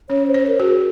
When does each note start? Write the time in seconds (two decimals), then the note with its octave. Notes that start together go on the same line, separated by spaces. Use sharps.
0.09 C#4 C#5
0.28 C5
0.34 C#5
0.48 A#4
0.60 F#4
0.66 G#4